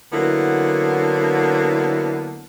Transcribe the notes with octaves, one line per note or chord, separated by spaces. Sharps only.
D3 F#3 A#3 B3 E4